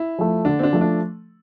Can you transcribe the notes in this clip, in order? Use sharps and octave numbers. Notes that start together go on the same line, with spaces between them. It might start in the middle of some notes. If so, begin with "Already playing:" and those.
Already playing: E4
F3 A3
D3 D4
C4
D4
F3 A3
D4